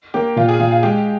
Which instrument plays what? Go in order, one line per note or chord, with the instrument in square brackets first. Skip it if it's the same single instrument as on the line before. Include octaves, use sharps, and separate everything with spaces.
[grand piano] A#3 [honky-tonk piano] G4
[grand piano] A#2 [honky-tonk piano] F4
[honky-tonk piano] G#4
[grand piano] A#2 [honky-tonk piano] F4
[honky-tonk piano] F4
[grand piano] G#3 [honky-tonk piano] G4